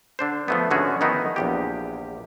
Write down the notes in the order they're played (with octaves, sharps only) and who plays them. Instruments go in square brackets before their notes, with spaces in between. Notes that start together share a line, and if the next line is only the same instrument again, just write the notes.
[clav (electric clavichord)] D3 D4 C5
F3 A3 B3
G#2 D3 B3 C#4 F#4 G#4
D#3 F3 B3 D#4 E4
A#1 E2 G4